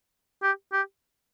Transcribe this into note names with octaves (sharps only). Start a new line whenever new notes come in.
G4
G4